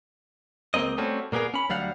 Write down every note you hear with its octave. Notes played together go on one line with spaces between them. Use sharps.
C#2 A#3 C4 D#5
G3 A3 C4 C#4 F#4
A#2 A#3 B3 G#4 A#4
C#4 B5
D2 F#3 G3 F5 F#5